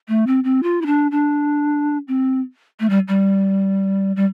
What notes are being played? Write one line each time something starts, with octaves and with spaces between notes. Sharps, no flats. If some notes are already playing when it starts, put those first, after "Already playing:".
A3
C4
C4
F4
E4
D4
D4
C4
A3
G3
G3
G3